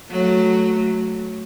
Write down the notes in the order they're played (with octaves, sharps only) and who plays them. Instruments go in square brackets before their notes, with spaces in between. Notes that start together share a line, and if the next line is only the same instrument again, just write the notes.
[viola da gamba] F#3 A3